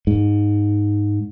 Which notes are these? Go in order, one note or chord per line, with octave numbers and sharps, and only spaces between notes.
G#2